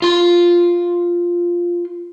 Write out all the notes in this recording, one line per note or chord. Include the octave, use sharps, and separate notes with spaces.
F4 C6